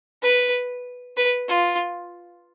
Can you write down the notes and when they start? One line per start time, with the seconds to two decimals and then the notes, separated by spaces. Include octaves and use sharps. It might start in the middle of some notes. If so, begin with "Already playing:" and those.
0.23 B4
1.17 B4
1.49 F4